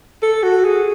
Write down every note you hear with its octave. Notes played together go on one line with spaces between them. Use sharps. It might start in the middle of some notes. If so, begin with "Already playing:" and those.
A4
F#4
G#4